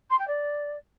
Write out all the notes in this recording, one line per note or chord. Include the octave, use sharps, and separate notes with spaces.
C6
G5
D5